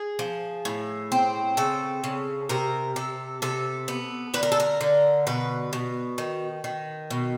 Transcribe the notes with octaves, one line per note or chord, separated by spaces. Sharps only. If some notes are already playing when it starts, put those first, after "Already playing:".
Already playing: G#4
F3
A2
C4
C#3 A4
C#3
C3 A#4
C3 A4
C3 A4
B3
D3 B4
A#4
A4
A#4
D3
B2 B4
B2
D#3
D#3
B2